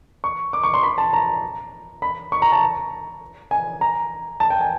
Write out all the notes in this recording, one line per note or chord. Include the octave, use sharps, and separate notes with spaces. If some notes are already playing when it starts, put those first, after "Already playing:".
C#6
D6
C#6
C6
B5
A5
A#5
B5
C#6
A#5
A5
G#5
A#5
A5
G5
G#5